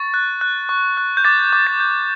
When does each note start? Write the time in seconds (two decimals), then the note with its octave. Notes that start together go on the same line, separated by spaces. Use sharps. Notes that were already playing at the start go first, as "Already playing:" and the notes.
Already playing: C#6 A6
0.14 F#6
0.41 F#6
0.69 C#6
0.97 F#6
1.17 G6
1.24 D6 A6
1.53 D6
1.67 A6
1.80 G6